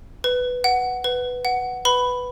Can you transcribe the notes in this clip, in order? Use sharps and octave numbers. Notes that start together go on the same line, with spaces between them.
B4
F#5
B4
F#5
B4 B5